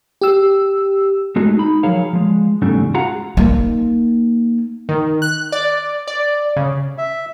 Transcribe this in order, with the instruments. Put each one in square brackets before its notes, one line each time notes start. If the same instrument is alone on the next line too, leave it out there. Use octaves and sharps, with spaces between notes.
[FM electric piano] G4 E6
[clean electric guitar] G#3 A3 D#4 F#4 G#4
D#4 B5
F3 F#3 G#4 A#4 C#5 F5
F3 G#3
E2 G#2 C#3 G3 A3 C#4
F4 F#4 G#4 F5 F#5 A#5
[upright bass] A#3 D#4
[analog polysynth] D#3
F#6
D5
D5
C#3
[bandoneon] E5